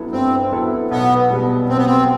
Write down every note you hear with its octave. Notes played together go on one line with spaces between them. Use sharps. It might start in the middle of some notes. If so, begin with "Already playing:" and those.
Already playing: G2 F#3 B3 E4 A4
G2 C4
F#3 B3 E4 A4
B1 B3
B2 G3 B3
B1 C4
B3
C4